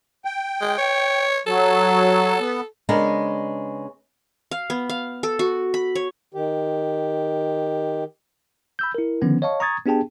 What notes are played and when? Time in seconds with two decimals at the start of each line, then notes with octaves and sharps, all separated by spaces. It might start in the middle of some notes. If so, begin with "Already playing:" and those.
0.25 G5
0.61 G#3
0.78 C#5
1.47 F#3 A4
2.40 B3
2.89 C#3 G#3 B3 D4 A#4
4.51 F5
4.70 B3
4.90 F5
5.23 A4
5.39 F#4
5.74 B5
5.95 C#5
6.34 D#3 G4
8.79 B5 E6 G6
8.95 E4 A#4
9.22 D3 D#3 F3 B3 C#4
9.42 C#5 D#5 F5 A5 C#6
9.60 A#5 C#6 D#6 G#6 A6
9.86 B3 D4 G4 G#4 G5 A5